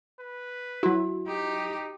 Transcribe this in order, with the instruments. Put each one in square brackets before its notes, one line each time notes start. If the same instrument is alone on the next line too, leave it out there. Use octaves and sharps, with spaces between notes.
[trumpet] B4
[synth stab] F#3 E4 [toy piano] F#4
[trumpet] D#4 [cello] G4